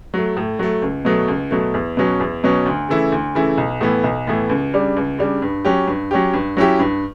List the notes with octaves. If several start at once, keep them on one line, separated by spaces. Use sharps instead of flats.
F#3 A3
A2
F#3 A3
C#2
B2 F#3 A3
C#2
B2 F#3 A3
E2
B2 F#3 C#4
E2
B2 F#3 C#4
D2
C#3 E3 A3 E4
D2
C#3 E3 A3 E4
B1
A2 E3 B3
B1
A2 E3 B3
C#2
C#3 G3 D4
C#2
C#3 G3 D4
G2
F#3 C#4 G4
G2
F#3 C#4 G4
G2
F#3 C#4 E4 G4
G2